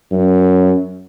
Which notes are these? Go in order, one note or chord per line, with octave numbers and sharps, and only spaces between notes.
F#2